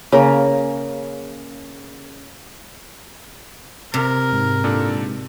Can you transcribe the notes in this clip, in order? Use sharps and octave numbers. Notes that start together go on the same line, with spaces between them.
C#3 A#3 A#4
C3 A#4
G#2
A#2 D4 A4